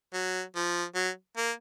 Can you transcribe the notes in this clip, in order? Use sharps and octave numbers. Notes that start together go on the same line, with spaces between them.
F#3
F3
F#3
A#3